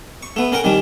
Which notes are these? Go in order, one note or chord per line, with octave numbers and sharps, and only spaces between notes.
C#6
A3 B3
C#4 A#4 F#5 G5
D#3 G3 C#4 D4